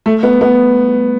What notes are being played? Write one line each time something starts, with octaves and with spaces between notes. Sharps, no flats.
A3
B3
B3